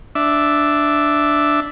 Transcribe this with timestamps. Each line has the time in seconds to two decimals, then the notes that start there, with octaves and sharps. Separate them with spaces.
0.15 D4 E5